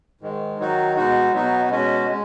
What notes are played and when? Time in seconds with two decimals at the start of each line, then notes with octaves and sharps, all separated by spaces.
0.21 G#2 D#3 G#3
0.59 D#3 F#3 D#4 F#4
0.95 B2 G#3 D#4 F#4
1.33 B2 F#3 B3 D#4 F#4
1.69 B2 G#3 C#4 F#4
2.09 G#3